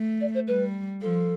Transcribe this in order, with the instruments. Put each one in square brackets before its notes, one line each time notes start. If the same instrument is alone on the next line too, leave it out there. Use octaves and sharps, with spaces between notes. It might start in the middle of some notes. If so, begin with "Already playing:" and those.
Already playing: [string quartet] A3
[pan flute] D5
C5
[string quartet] G3 [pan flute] B4
[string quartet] F3 [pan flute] A4